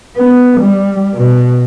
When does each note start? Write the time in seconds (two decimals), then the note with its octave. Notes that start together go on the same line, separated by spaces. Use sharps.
0.17 B3
0.60 G3
1.14 B2